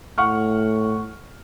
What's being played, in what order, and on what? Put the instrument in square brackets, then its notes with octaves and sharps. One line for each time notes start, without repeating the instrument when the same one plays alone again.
[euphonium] A2 [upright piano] F#5 C#6 F6